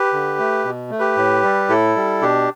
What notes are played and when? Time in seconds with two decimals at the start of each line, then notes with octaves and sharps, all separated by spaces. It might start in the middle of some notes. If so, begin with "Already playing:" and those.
Already playing: G4 B4
0.13 D3
0.39 A3
0.65 B2
0.91 A3
0.99 G4 B4
1.17 A2
1.43 G3
1.69 A2 E4 A4
1.96 G3
2.21 B2 D4 G4